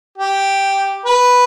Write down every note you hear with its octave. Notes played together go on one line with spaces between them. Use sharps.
G4
B4